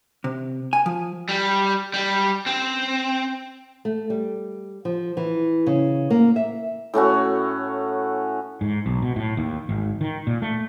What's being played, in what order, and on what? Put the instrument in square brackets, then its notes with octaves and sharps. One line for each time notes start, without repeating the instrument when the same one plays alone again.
[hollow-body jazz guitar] C3
G#5
F3
[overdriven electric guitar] G3
G3
C4
[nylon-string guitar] A3
G3
F3
E3
C#3
A#3
E5
[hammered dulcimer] A2 A3 C#4 F#4
[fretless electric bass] G#2
B1
B2
A2
D#2
G#1
D#3
A#2
A3